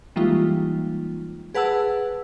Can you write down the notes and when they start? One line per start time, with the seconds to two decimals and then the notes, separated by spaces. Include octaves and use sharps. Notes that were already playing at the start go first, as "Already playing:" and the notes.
0.16 E3 G3 G#3 A#3 D#4 F4
1.54 G#4 B4 F#5 A5 E6